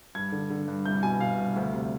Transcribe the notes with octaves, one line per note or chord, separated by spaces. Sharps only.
G2 G#6
D3
D3
G2
C2 G6
B2 G#5
B2 F5
C2
D2
C3